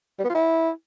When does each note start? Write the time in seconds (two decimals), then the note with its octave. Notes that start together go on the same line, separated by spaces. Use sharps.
0.19 G3
0.24 B3
0.30 F4
0.35 E4